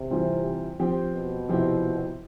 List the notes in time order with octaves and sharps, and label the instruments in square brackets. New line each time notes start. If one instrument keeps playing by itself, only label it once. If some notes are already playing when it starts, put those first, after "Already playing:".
Already playing: [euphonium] C3
[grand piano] E3 G3 C4 F4
F3 C4 G4
[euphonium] B2
[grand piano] C3 F3 C4 E4 G4